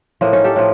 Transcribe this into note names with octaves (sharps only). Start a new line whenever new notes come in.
A2 F3 A#3
C#4 D#4
G4 A4
A2 F3